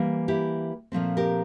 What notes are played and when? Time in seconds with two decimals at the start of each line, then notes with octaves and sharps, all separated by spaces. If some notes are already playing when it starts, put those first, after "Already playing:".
Already playing: E3 G3 A#3
0.28 E4 G4
0.92 A#2 F3 A3 C4
1.17 G4 A#4